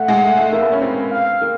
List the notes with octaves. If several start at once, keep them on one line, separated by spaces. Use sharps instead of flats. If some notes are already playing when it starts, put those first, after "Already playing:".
Already playing: A3 F#5
G#3
A3
A3
A#3 E5
B3
C#4
C4
F5
A#3